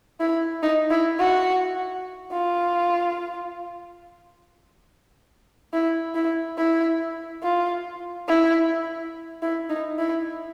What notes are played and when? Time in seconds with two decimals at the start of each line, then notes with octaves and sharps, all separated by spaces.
0.20 E4
0.63 D#4
0.91 E4
1.19 F#4
2.32 F4
5.73 E4
6.15 E4
6.58 E4
7.43 F4
8.28 E4
9.42 E4
9.70 D#4
9.99 E4